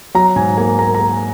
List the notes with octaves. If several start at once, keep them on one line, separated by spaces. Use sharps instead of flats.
F#3 A#5
G#2 G#5
A#3 G#5
A#3 A#5
A#5
A#3
G#5